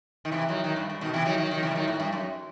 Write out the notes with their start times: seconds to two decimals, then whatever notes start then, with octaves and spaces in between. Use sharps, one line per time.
0.25 D#3
0.31 C3 E3
0.48 D#3 F#3
0.64 D#3 F#3
0.76 G2
0.90 G2
1.01 B2 D#3
1.13 C3 E3
1.25 D#3 F#3
1.38 D#3 F#3
1.51 D#3 F#3
1.63 C3 E3
1.71 G3
1.75 D#3 F#3
1.88 A2
2.00 G2
2.13 F#2